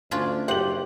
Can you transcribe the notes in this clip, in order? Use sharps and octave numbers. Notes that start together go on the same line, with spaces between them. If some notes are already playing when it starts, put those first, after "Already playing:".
D2 C#4 D4 F4
F#1 G4 C5 F#5 F#7